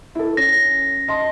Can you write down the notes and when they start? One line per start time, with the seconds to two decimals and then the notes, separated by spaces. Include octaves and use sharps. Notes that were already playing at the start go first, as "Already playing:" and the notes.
0.15 E4 A4
0.37 C#4 A#6
1.08 D#5 A5 C6